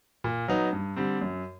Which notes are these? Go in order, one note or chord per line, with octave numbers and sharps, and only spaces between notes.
A#2
F#3 B3 D#4
G2
D3 G3 C4
F#2